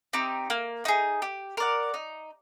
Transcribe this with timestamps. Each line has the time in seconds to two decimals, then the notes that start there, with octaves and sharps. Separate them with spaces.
0.13 C4 D#4 G4
0.50 A#3
0.85 D#4 G#4
1.22 G4
1.57 A#4 D5 F#5
1.94 D#4